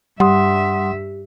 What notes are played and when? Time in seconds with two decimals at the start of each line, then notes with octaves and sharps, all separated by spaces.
0.20 G2 G3 G4 E5 F#5 C6 D#6